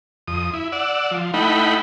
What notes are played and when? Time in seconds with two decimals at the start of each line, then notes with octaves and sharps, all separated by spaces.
0.28 F2 D#6
0.53 E4
0.72 D5 F#5 E6
1.11 F3
1.34 A3 D#4 E4 F#5 G5 B5